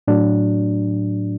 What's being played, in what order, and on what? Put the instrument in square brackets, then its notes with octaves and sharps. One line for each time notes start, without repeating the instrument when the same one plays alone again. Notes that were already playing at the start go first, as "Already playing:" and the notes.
[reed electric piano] A2 F#3 D4